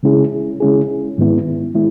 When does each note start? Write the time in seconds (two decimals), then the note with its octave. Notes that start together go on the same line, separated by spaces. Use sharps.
0.03 C#3 G#3 C#4 E4 G#4
0.60 C#3 G#3 C#4 E4 G#4
1.18 G#2 D#3 G#3 B3 E4
1.74 D#3 G#3 B3 E4